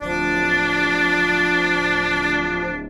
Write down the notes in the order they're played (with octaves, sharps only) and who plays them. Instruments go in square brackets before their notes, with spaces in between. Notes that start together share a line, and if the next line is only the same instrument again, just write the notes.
[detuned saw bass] D1 [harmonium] F3 [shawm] D4 [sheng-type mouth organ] D5